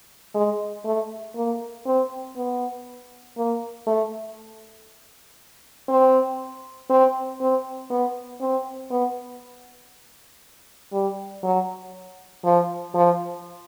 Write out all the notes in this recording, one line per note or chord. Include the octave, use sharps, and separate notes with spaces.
G#3
A3
A#3
C4
B3
A#3
A3
C4
C4
C4
B3
C4
B3
G3
F#3
F3
F3